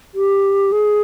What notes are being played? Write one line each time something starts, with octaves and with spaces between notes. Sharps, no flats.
G4
G#4